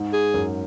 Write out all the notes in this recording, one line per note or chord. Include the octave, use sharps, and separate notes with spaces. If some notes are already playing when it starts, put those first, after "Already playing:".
Already playing: G#2
G#4
F#2